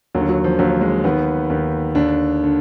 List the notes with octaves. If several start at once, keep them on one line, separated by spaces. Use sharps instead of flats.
D#2 D3 F#3
F#3
F3
D#2 D3 F#3
G#3
D#2 D#3 B3
D#2 D#3
D#2 D3 D4
D3